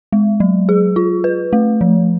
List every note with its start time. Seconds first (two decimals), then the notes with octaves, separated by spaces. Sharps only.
0.12 G#3
0.40 F#3
0.69 G#4
0.96 F4
1.24 B4
1.53 A3
1.81 F3